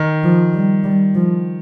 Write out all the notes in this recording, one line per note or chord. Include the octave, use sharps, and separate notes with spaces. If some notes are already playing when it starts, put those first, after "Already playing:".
Already playing: D#3
F3
G3
G3
F3